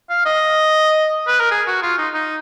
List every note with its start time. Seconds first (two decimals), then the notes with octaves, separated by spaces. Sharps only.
0.10 F5
0.26 D#5
1.27 B4
1.40 A#4
1.51 G#4
1.67 F#4
1.82 F4
1.98 D#4
2.14 D#4